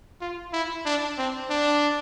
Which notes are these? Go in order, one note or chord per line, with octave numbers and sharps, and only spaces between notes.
F4
E4
D4
C4
D4